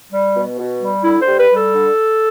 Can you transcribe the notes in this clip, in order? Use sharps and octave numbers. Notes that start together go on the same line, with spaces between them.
G3
B2
B2
G3
D3 E4
C5
G3
B4
G3
A4
D3